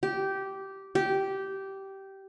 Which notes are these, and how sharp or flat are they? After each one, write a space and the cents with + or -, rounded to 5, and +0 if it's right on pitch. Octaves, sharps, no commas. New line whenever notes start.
G4 -15
G4 -15